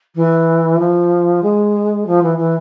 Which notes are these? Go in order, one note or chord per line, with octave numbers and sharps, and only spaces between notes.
E3
F3
G#3
F3
E3
E3